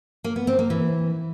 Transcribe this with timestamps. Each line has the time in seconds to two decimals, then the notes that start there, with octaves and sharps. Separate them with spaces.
0.24 A#3
0.36 B3
0.47 C4
0.59 A#3
0.70 E3